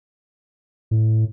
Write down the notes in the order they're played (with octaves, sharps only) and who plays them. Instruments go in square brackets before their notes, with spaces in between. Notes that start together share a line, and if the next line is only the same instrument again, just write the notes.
[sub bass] A2